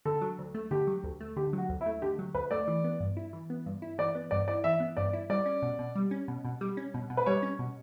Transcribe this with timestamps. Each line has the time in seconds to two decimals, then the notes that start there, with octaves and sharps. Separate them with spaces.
0.05 D3 A4
0.21 F#3
0.39 D2
0.54 A3
0.71 D3 G4
0.87 F#3
1.04 D2
1.20 A3
1.36 D3 G4
1.53 F#3 F#4
1.69 D2
1.81 E4
1.86 A3
2.02 D3 G4
2.19 F#3
2.34 D2 B4
2.51 A3 D5
2.68 E3
2.84 B3
3.00 G2
3.17 E4
3.33 E3
3.50 B3
3.66 G2
3.82 E4
3.98 E3 D5
4.15 B3
4.31 G2 D5
4.48 E4 D5
4.64 E3 E5
4.80 B3
4.97 G2 D5
5.13 E4
5.30 G3 D5
5.46 C#4
5.62 B2
5.79 B2
5.95 G3
6.11 C#4
6.28 B2
6.45 B2
6.61 G3
6.77 C#4
6.94 B2
7.10 B2
7.17 B4
7.26 G3 C#5
7.43 C#4
7.59 B2